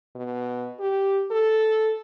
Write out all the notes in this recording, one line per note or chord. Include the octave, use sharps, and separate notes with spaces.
B2
G4
A4